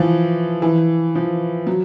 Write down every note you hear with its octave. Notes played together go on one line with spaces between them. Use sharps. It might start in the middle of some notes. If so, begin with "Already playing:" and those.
Already playing: E3 F3
E3
F3
F#3